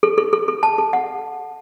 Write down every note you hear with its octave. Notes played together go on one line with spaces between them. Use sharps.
A4
A4
A4
A4
A5
A4
F#5